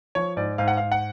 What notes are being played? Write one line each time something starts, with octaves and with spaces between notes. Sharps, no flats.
F3 C#5
G#2 D5
G#2 F5
F#5
G#2 F5
F#5